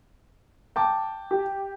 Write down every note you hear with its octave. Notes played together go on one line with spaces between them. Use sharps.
G5 A5 D6
G4